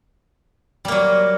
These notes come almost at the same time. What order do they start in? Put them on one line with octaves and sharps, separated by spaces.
G3 A#3 F#3